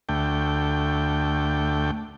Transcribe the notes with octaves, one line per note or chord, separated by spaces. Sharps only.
D2 A3 G5